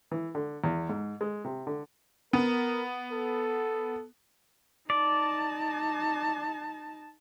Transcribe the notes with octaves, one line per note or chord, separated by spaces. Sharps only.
E3
D3
E2
G#2
G#3
C3
D3
B3 A#4
A4
D#4 D5 A5